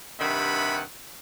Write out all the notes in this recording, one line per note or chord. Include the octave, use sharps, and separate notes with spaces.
G2 C3 D#3 E5 F#5 B5